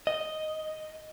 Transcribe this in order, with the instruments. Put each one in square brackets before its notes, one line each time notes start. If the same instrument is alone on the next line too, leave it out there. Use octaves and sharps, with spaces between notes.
[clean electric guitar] D#5